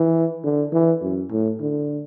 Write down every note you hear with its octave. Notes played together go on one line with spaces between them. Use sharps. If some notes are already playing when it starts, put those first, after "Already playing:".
Already playing: E3
D3
E3
F#2
A2
D3